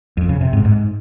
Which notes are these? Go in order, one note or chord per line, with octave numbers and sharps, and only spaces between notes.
F2
C#3
C3
G#2
G#2